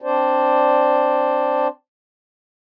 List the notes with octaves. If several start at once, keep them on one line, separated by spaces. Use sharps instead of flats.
C4 D4 C5 D5